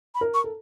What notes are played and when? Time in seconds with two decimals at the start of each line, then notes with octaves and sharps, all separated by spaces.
0.15 B5
0.21 A#4
0.34 C#6
0.44 A4